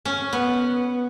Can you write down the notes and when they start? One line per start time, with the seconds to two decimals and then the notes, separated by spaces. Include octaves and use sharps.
0.05 C#4
0.33 B3